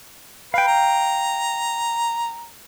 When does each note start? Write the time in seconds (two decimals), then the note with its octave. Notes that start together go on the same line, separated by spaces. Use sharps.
0.54 B4 F5 G5
0.68 A#5